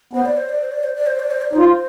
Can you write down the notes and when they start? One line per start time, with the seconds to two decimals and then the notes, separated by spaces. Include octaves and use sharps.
0.13 B3 C5
0.25 D5
0.37 C5
0.49 D5
0.61 C5
0.72 D5
0.84 C5
0.95 D5
1.07 C5
1.19 D5
1.31 C5
1.42 D5
1.53 D#4 C5
1.57 F4